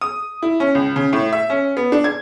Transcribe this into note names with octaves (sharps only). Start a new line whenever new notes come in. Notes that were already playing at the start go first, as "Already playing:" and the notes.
D#6
E4
C#4
C#2
C#3
A2
E5
C#4
B3
D4
G#6